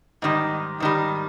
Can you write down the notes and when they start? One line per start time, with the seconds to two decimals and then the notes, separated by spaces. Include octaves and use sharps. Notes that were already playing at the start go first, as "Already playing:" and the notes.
0.22 G#2 D#3 G3
0.80 G#2 D#3 G3